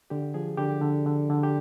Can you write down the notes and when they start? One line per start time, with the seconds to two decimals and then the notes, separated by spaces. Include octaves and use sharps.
0.10 D3 G4
0.34 F3 G#4
0.57 D3 G4
0.82 D3
1.06 D3
1.29 D3
1.43 G4